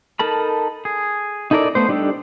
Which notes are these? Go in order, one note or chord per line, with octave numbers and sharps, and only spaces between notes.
D#4 A4 A#4 A5 B5
G#4
D#4 E4 A4 A#4 D5
A3 B3 C5
G3 D4 D#4 G4 A4